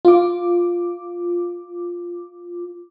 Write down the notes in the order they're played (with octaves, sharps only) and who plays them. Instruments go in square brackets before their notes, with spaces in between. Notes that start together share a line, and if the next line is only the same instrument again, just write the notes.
[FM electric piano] F4 D6